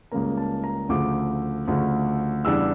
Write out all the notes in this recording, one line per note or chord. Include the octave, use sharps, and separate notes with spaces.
C#2 C#3 G3 A#3 C#4 A#5
A5
A#5
D2 C#3 F3 A3 D6
D2 C#3 F3 A3
E2 C#3 G3 D4 E6